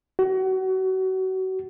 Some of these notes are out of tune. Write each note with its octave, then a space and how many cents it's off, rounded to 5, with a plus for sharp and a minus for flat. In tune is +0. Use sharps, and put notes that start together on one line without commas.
F#4 +30